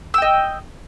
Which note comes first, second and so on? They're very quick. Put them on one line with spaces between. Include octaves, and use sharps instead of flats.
E6 G5 D#5